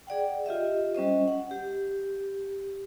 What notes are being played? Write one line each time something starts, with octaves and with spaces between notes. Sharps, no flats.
G#4 D5 F#5 G5
F4 G4 D#5 E5
G3 C#4 C5 D#5
F#5
G4